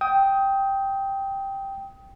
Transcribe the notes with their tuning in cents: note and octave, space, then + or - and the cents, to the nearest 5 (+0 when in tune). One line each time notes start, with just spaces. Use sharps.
G5 +0 D#6 +25